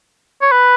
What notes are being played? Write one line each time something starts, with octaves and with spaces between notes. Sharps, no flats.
C#5
B4